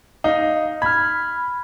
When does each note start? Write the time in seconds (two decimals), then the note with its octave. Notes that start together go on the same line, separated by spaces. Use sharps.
0.24 D#4 F5
0.82 B5 F6 G#6